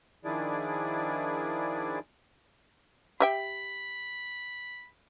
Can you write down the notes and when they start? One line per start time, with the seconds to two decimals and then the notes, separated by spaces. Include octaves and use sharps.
0.25 D#3 F3 D4 E4 G#4 D5
3.20 G4 E5 G5 B5